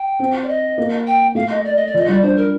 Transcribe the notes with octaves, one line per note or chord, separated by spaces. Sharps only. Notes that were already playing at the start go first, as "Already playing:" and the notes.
Already playing: G5
C4
D5
D#5
A#3
G5
A3 F5
D#5
D5
D#5
D5
F3 D#5
G3 D5
D4 C5
A#4